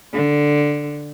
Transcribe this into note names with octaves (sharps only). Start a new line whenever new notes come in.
D3